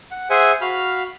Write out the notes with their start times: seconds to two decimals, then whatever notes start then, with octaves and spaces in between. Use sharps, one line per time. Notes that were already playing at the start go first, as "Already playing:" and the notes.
0.11 F#5
0.30 G#4 C5 E5 F#5 G#5
0.61 F#4 F5 B5 F6